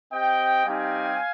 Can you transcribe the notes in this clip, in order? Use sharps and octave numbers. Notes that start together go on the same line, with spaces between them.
C4 G4 D#5 G5
G3 C4 D#4 G4 F5 G#5